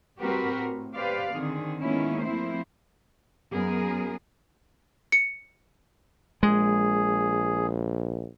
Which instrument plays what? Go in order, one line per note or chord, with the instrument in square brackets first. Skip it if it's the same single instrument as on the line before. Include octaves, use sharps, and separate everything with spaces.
[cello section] G3 C4 F#4 G4 A#4 B4
A2
G4 B4 C5 D5 F5
D3 D#3 C4 G#4
D#3 G#3 A#3 B3 C#4 E4
F3 A3 A#3 C4 E4 C5
F#2 B3 G#4 A#4
[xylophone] C#7
[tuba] A#1 [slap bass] G#3 [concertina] G#4